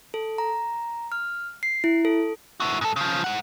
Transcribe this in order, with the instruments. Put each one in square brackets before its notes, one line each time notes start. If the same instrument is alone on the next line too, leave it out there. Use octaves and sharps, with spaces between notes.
[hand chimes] A4
A#5
F6
C7
E4
A4
[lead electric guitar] E4 F#4
G#2 A4
C#3 F3
G#2 F#5